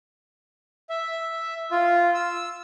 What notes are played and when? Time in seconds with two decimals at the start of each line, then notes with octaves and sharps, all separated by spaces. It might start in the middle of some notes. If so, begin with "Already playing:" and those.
0.89 E5
1.71 F4
2.14 E6